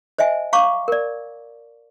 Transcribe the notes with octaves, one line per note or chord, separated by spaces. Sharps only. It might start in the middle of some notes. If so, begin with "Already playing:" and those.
C5 D#5 E5 G#5
F5 A#5 C#6 D6
A#4 D5